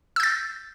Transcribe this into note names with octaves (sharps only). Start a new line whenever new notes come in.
E6 G6 A6